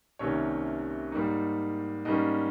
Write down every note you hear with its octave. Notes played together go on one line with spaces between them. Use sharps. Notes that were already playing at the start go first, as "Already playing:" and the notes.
C2 C3 D#3 A#3 C#4 C#5
G#2 G3 A#3 D#4
G#2 G3 A#3 C#4 D#5